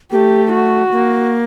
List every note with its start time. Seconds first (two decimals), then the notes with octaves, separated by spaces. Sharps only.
0.12 A3 A#3 G4
0.52 F#4
0.92 A#3